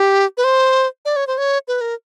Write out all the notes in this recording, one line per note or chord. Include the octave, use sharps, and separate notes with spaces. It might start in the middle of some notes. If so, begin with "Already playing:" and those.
Already playing: G4
B4
C5
D5
C#5
C5
C#5
B4
A#4